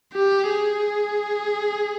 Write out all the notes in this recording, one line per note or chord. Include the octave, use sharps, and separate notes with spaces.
G4
G#4